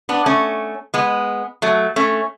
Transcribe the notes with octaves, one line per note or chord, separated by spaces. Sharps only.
B3 D4
A3 C#4
G#3 B3
F#3 A3
A3 C#4